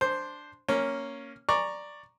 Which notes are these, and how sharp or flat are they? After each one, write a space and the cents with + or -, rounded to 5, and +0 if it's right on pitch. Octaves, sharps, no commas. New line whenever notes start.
D4 +0 C5 +0
A#3 +0 C#4 +0
D5 +5 A#5 +0 C#6 +0